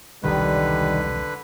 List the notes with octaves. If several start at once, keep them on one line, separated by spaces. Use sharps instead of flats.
E1 C2 D3 D#3 F3 G3 B4